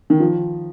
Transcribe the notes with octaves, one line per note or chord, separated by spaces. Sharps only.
D#3
F3